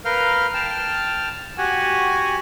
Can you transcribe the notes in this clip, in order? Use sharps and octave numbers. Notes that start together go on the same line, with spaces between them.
A#4 B4 F5 F6 G6
G5 A5 F6
F#4 G4 F#5 G#5